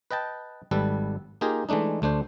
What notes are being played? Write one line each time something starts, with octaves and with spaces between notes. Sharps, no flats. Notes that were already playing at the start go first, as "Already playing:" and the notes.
B4 D#5 G5 A5
G#1 G3 A4 B4
A#3 D#4 F4 G4 G#4 A#4
E3 G#3 A3 D4 D#4
D2 A3 D4 C5